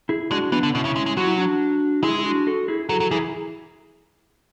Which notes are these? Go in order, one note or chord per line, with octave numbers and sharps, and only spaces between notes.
E4 G#4
G#3 D4 F#4
E3 B3 D4
D3
B2 C#4 E4
C#3
G#3
G#3
F#3 F#4
E4
D4 F#4
G#3 E4 G#4
E4
D4 F#4
F#4 A4
E4 G#4
F#3 F#4 A4
F#3
E3 E4 G#4